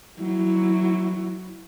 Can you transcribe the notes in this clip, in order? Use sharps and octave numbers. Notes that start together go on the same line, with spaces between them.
F#3 E4